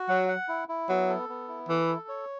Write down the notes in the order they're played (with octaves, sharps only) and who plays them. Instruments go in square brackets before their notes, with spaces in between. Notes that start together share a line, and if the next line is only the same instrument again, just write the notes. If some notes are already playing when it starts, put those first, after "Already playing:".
Already playing: [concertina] F#4
[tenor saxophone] F#3 [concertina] F#5
[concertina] F#5
E4
E4
[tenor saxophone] F#3 [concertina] B3
[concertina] A4
B3
E4
[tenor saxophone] E3 [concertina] A4
[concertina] A4
C#5